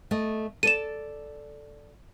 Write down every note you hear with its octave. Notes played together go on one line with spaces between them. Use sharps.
A3 D#5
A4 D5 D#7 E7